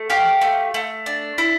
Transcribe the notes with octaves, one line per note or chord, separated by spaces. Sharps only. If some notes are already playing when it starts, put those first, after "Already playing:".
Already playing: A3
G4 F5
A3
A3
D4
E4